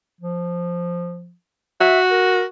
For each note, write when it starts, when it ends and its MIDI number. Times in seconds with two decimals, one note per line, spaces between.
0.21 1.33 53
1.81 2.45 66
1.81 1.99 76
2.11 2.44 70